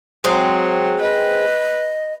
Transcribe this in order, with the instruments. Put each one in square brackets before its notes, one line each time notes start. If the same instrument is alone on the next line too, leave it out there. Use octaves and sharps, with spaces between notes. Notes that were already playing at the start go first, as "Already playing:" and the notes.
[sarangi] F#3 [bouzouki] G#3 C4 G#4
[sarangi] B4 [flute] D#5